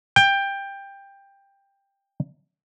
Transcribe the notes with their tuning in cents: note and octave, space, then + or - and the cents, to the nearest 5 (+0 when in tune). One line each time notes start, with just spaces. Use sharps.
G5 +15